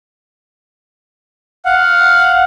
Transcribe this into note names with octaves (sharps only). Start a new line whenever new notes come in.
F5 F#5